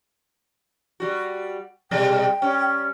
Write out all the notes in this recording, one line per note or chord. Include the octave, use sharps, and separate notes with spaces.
G3 F#4
B2 G3 G#3 G5
G3 C#4